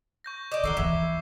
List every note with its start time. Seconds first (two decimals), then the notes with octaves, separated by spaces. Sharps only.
0.24 C#6 G6 A#6
0.52 D5 D#5 D6 G6 E7
0.64 D#3 A4 A#4 F#5 C#6 C7 G7
0.77 D#2 E3 E4